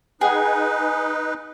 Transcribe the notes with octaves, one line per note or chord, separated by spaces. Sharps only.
D#4 G#4 B4 F#5 G5